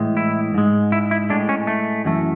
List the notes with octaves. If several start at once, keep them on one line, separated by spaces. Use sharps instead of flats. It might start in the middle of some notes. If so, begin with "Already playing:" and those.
Already playing: A2 E3 G#3
E4
G#2 G#3
E4
E4
A2 G#3 D4
C#4
A3
F#2 E3 A3